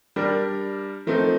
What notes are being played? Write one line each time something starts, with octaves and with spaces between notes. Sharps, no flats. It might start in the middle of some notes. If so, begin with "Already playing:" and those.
G3 D4 G4 A#4
F3 A3 C4 D#4